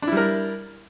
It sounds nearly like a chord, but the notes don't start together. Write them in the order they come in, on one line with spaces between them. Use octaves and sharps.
D4 E4 G3 A#4